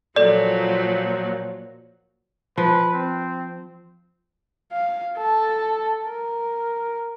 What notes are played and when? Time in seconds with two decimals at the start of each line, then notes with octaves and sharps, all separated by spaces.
0.16 A#2 F3 F#3 A4 D5
2.58 F3 B4
2.94 C4
4.72 F5
5.17 A4
6.07 A#4